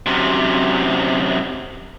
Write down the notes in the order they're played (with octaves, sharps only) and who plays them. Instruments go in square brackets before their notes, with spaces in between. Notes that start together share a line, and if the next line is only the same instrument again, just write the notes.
[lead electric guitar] F#2 C3